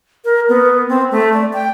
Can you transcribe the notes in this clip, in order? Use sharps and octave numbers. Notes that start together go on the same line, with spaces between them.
A#4
B3
C4
A3
D5
G5